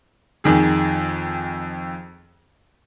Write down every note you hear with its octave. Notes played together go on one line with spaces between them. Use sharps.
F2 D#3 G#4